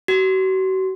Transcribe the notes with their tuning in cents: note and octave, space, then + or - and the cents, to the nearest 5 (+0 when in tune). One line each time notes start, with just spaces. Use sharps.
F#4 +40